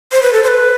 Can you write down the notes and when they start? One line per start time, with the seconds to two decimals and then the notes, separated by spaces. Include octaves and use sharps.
0.12 C5
0.22 B4
0.33 A4
0.43 C5
0.48 B4